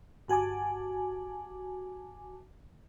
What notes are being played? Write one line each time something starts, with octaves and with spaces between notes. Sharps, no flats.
G1 F#4 G#5 A5 D6